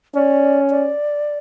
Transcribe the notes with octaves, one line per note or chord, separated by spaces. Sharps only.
C#4 D5
D5